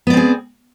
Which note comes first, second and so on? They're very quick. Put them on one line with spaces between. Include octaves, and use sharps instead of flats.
B3 D5 C4 G#4